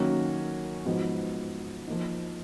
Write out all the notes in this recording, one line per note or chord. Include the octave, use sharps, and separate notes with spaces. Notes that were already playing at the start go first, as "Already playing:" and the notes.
Already playing: D#3 F#3 A#3 C#4 F#4
G#2 F3 B3 D#4 F#4
F3 A#3 D#4